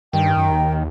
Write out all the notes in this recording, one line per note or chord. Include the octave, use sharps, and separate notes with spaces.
G2 D#3 G5
F#2
D#2